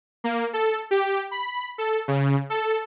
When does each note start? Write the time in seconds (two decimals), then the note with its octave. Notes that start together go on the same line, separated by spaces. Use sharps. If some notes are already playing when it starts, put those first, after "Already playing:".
0.24 A#3
0.53 A4
0.91 G4
1.31 B5
1.78 A4
2.08 C#3
2.50 A4